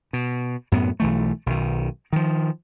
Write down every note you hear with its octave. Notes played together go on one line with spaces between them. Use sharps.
B2
F#2 A2 B3
B1 E3 A3
B1 D#3
D#3 F3